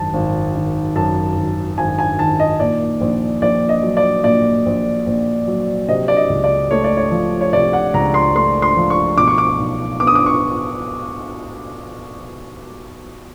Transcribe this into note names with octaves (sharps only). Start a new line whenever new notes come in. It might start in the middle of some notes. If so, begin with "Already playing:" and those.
Already playing: G#1 F#2 A5
G#1
D#3
F#2 A5
G#1
G#1 G#5
G#5
D#3 A5
D#5
A#2 D5
A#1
A#1 D5
D#5
F#3
D5
A#2 D5
A#1
A#1
F#3
C3 D#5
D5
D#5
C#2
D5
A3 C#5
D5
C#5
F3
C#5
C3 D5
F#5
C#2 A#5
C6
A3 C6
C6
F3
C#6
B2 D6
C#6
D6
B1
B3 D6
D#6
D6
C#6